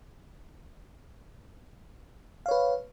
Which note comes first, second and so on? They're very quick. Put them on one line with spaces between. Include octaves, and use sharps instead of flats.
F5 C#5 B4